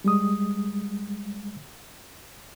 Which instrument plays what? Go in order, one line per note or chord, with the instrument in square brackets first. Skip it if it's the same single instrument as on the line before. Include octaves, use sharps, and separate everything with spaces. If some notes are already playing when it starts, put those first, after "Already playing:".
[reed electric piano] G3 G#3 D#6